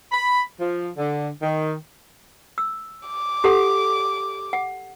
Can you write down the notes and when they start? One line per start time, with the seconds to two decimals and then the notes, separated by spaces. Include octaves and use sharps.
0.12 B5
0.59 F3
0.97 D3
1.41 D#3
2.58 E6
3.07 D6
3.44 G4 A4 F#5
4.53 F#5